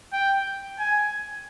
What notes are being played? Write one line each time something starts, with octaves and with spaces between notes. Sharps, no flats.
G5
G#5